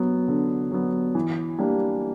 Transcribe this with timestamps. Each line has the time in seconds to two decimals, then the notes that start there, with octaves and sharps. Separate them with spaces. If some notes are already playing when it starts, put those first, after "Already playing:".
Already playing: F#3 B3
0.28 D3
0.72 F#3 B3
1.15 E3
1.58 G3 A#3 D4